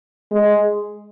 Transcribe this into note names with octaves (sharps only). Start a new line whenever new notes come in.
G#3